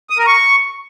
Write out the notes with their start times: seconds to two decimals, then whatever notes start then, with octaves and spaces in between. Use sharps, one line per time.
0.10 D#6
0.18 A#4
0.27 C#6